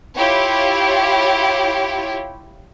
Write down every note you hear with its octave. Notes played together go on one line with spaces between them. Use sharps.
E4 F4 G4 C#5